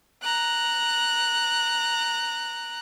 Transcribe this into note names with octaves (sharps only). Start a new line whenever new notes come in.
A#5 F#6